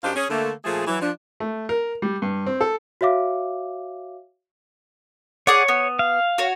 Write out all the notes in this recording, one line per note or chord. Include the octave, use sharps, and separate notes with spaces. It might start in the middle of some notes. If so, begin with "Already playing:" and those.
F#2 D4 D#4 G4 C5 F5
C#4 G#4
D3 A3 A#3
A#2 F3 A3 G#4
E3 F#3
F3 D4
A3
A#4
G3
G2
C4
A4
F#4 C#5 E5 F5 D6
G#4 C#5 D5 F#5
B3
F5
F#4 C#5